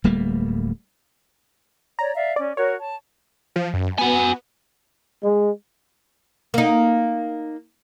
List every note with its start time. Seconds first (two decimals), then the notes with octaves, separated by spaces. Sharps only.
0.04 D1 G3 A3 A#3
1.99 C#5 D5 A#5
2.14 D5 E5 F5
2.36 C#4 D5
2.57 F#4 A#4 C#5
2.79 A5
3.56 F3
3.74 F#2
3.98 B3 F#4 G#5
5.22 G#3
6.54 A#3 D#4